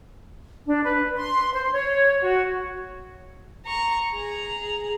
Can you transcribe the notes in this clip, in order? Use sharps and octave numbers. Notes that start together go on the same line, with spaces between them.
D4
B4
C6
C5
C#5
F#4
A#5 C#6
G#4 A#5